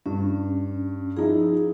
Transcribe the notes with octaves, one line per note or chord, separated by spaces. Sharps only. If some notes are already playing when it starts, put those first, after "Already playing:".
G2 C#4
F3 D#4 E4 G#4